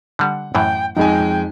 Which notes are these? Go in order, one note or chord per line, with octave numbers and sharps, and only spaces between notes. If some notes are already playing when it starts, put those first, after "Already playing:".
D3 G3 F#5
F#2 A2 E3 G5
F2 G#3 D#4 G5 G#5